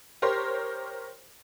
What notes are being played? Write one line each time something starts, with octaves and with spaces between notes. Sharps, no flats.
G4 A#4 C5 C#5 C6